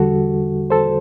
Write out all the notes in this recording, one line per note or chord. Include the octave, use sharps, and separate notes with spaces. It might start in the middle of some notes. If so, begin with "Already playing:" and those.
Already playing: E2 D3 G3 F#4 A4
A4 C5